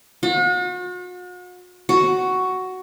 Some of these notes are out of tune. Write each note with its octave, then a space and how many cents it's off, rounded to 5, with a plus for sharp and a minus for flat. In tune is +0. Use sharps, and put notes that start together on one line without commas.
F#4 -45
F#4 +5